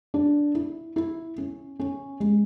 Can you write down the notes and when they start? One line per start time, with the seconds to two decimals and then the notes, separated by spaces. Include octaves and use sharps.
0.14 D4
0.55 E4
0.96 E4
1.38 C#4
1.80 C#4
2.20 G#3